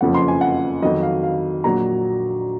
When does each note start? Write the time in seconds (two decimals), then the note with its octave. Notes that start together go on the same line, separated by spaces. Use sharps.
0.01 F#1 F2 C#3 F3 F#5
0.15 C6
0.28 G#5
0.41 F#5
0.82 F2 D#3 F#3 D#5
1.03 F5
1.23 F5
1.64 A#1 A#2 F#3 A#5